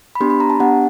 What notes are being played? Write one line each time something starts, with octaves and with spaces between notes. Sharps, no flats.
B5
B3 D4 G4 C6
B5
A#5
A5
B3 D4 G4 F#5